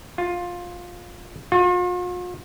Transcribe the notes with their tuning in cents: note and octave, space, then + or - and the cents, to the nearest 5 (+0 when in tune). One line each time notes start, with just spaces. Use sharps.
F4 +15
F4 +45